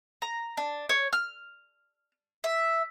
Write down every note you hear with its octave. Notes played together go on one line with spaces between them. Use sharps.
A#5
D4
C#5
F6
E5